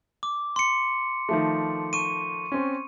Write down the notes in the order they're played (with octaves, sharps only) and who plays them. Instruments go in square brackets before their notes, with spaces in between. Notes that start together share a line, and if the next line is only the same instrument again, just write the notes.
[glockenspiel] D6
C6 C#7
[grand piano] D#3 F3 A3
[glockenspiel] C#6 D#7
[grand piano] C4 C#4